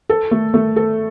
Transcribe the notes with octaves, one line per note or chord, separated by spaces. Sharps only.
A4
A3
A3
A4